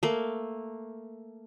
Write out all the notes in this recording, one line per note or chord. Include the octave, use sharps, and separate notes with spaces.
A3 A#3